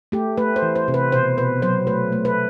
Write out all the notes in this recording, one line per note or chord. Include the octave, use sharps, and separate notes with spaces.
A3 G4
A3 B4
C5
E3
C5
C3
B4
B2 C5
B2 B4
F#3 C5
A3 B4
A3
B4